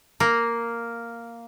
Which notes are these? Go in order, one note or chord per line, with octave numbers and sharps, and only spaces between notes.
A#3